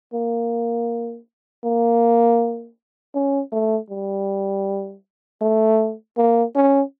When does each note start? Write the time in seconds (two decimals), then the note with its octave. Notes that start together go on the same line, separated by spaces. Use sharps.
0.13 A#3
1.64 A#3
3.15 C#4
3.52 A3
3.90 G3
5.41 A3
6.17 A#3
6.55 C#4